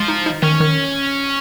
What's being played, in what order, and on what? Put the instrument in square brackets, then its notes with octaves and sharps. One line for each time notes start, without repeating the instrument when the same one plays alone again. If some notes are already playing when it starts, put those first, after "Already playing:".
Already playing: [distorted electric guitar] F3 [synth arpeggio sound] G#3
[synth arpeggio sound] D#4
D#4
[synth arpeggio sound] D#3 [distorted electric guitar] C#4
[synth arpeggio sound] D#3